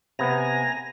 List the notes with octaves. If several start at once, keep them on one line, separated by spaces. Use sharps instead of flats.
C3 B3 G#5 A#5 A#6